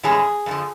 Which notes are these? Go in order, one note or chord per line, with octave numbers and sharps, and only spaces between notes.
A2 E3 G#3 C#4 G#4
F2 D3 F3